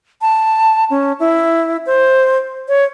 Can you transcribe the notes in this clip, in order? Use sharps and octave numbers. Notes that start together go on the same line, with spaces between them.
A5
C#4
E4
C5
C#5